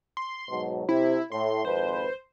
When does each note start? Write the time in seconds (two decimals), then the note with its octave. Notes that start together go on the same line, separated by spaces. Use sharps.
0.17 C6
0.49 G#2 B2 F#3
0.89 C3 E4
1.32 A2 C6
1.65 G#1 F2 B4 C5